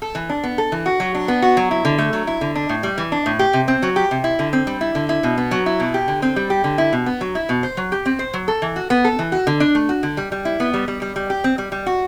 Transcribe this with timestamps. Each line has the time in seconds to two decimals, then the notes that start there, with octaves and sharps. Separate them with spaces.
0.02 A4
0.15 E3
0.29 D4
0.44 B3
0.58 A4
0.72 E3
0.86 F#4
1.00 F#3
1.15 D4
1.28 B3
1.42 F#4
1.57 F#3
1.71 E4
1.85 D3
1.98 A3
2.13 F#3
2.27 E4
2.41 D3
2.55 D4
2.69 A2
2.83 G3
2.98 E3
3.12 D4
3.26 A2
3.39 G4
3.53 C3
3.68 C4
3.82 F#3
3.96 G4
4.11 C3
4.24 E4
4.39 D3
4.53 C4
4.67 G3
4.81 E4
4.95 D3
5.09 E4
5.23 B2
5.38 B3
5.51 F#3
5.66 E4
5.80 B2
5.94 G4
6.08 D3
6.22 C4
6.36 G3
6.50 G4
6.64 D3
6.78 E4
6.93 B2
7.06 B3
7.21 F#3
7.35 E4
7.49 B2
7.63 C5
7.77 F#3
7.92 G4
8.06 C4
8.19 C5
8.34 F#3
8.48 A4
8.62 E3
8.76 F#4
8.90 B3
9.04 A4
9.19 E3
9.32 F#4
9.47 D3
9.60 D4
9.75 A3
9.89 F#4
10.03 D3
10.17 G3
10.32 G3
10.45 E4
10.60 B3
10.74 G3
10.88 G3
11.02 G3
11.16 G3
11.30 G4
11.44 C4
11.58 G3
11.72 G3
11.86 F#4